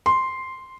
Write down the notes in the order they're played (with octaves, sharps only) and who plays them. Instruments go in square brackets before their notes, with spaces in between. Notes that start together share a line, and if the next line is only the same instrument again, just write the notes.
[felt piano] C6